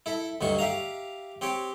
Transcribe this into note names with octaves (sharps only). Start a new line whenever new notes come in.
E4 A4 E5
D2 G2 F#3 D#4 C#6
G4 E5 F5 A#5
C4 G4 C#5 G5